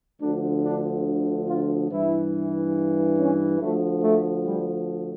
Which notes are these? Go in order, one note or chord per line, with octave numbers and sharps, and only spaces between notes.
D2 D3 F3 D4
D4
F4
G2 E3 E4
C#4
D2 D3 F3 A3
A3
G3